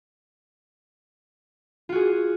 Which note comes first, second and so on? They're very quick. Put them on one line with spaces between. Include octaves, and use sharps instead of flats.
F4 F#4 G#4